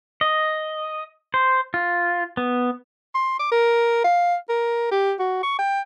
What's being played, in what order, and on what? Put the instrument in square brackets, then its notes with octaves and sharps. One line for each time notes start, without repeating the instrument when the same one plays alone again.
[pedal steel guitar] D#5
C5
F4
B3
[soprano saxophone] C6
D6
A#4
F5
A#4
G4
F#4
C#6
G5